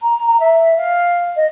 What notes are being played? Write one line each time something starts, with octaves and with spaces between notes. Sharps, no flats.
A#5
A#5
E5
F5
D#5